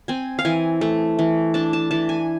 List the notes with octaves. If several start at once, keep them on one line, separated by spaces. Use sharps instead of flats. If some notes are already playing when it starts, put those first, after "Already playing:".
C4 G#5
F5
E3 G#5
A3
E3
D4 A5
A5
E3 A5
G#5